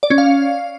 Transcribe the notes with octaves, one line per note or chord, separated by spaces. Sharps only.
D5
C#4
F5